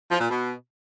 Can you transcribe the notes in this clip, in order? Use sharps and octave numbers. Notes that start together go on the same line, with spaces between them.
F3
A#2
B2